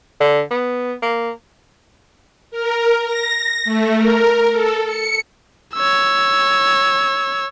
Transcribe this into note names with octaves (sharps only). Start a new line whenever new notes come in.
D3
B3
A#3
A#4
A#6
A3
A#4
A4
C#7
C#5 E6